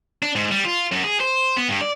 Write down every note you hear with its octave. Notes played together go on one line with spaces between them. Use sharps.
D4
G#2
G3
F4
F#2
G#4
C5
B3
G2
D5